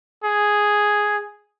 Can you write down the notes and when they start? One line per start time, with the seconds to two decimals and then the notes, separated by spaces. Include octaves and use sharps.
0.24 G#4